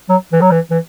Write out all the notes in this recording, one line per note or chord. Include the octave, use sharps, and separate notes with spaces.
F#3
E3
F#3
E3
E3